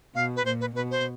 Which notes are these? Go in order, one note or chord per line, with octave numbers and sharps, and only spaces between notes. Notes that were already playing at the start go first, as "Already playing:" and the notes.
B2 F5
B4
A#2 C5
B4
B2 B4
C5